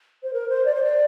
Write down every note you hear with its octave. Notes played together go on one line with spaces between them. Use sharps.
C5
A#4
C5
D5
C5
D5